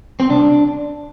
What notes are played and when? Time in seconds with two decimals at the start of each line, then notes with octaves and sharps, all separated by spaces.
0.20 C4
0.30 C2 D4